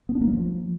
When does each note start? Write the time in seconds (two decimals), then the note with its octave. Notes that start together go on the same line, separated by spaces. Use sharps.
0.09 B3
0.15 D4
0.21 A#3
0.27 F#3
0.33 F3